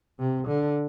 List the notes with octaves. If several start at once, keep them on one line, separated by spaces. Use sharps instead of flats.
C3
D3